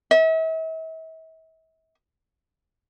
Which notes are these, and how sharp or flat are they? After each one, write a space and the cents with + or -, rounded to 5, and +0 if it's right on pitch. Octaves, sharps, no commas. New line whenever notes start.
E5 -40